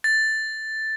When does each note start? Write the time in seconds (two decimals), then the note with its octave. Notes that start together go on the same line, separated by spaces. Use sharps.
0.04 A6